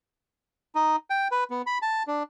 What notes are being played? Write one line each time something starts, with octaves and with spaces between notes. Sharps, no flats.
D#4
G5
B4
B3
B5
A5
D4